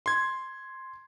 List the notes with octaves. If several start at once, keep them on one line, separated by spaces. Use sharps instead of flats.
C6 G#6